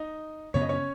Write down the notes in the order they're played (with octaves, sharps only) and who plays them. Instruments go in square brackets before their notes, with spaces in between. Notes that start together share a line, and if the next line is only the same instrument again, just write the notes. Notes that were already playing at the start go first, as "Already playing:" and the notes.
Already playing: [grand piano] D#4 D#5
[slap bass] F#2 C#3 B3 [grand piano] C#5
[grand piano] D#5
C#4 C#5